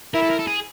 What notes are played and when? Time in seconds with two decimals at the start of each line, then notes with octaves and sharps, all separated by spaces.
0.14 E4 A#4
0.22 A4
0.30 A#4
0.39 A4
0.47 G#4